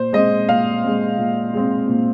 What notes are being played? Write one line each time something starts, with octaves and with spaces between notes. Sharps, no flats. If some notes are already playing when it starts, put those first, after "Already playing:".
Already playing: A#2 C5
G#3 C4 D#5
A#2 F5
G#3 C4
A#2
G#3 C4
A#2